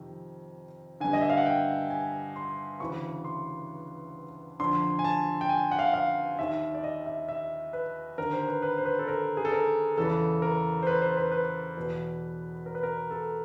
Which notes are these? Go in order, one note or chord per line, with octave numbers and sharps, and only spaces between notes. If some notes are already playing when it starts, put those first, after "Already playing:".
Already playing: F2 C3 D#3
G2 D3 G#5
D#5
E5
F5
F#5
G5
G#5
C6
D2 C#3 E3 C#6
C6
F2 D3 C6
G#5
A5
G5
G#5
F#5
F5
F#5
F5
D#2 D#3 E5
D5
D#5
E5
E5
B4
D#2 D3 A#4
C5
B4
B4
C5
B4
A4
A#4
G#4
A4
A#4
E2 C#3 E3 A4
A#4
C5
B4
C5
B4
B4
E2 B2
A#4
B4
A#4
A4